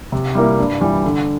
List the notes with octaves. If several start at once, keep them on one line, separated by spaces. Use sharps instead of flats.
C3
G3 A#3 E4 A#4
G2
E3 G3
D3